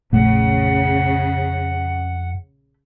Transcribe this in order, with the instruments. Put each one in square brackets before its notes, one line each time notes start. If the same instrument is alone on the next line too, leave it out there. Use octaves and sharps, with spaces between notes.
[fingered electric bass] A#1 A3 [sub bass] F2 [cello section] C#3 [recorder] F#5